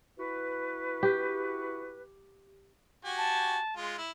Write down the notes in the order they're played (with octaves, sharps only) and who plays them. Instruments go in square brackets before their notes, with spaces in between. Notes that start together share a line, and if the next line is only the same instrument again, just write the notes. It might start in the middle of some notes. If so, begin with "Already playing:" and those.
[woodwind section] E4 F#4 B4
[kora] G4
[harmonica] F#4 G4 G#5
[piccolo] A5
[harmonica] G#3 F4
E4